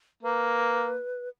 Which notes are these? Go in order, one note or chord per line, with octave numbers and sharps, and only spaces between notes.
A#3 B4